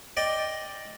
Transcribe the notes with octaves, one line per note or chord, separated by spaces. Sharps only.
D5 D#5 G5